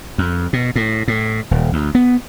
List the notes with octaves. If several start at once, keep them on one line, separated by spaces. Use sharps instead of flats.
F2
B2
A2
A2
D#1
D2
B3